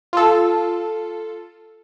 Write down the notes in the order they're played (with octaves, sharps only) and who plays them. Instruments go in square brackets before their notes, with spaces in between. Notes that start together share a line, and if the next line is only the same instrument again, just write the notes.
[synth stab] F4 A4